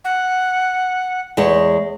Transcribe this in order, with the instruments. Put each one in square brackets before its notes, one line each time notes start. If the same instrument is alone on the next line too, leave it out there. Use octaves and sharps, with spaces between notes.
[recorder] F#5
[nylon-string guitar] E2 G#3 C#5